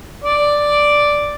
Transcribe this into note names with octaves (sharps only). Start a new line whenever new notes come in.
D5